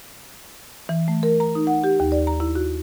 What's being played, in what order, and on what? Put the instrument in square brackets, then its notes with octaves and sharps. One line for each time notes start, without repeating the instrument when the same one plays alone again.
[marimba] E3
A3
A#4
A#5
D#4
F#5
G4
D#2
D5
A#5
E4
F#4